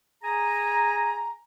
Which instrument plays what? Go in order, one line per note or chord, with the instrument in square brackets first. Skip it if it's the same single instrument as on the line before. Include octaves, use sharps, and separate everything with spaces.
[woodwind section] G#4 G#5 A#5